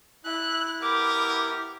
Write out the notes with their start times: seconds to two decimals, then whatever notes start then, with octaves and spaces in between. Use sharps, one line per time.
0.25 E4 E5 F#6
0.82 B3 G4 A#4 D6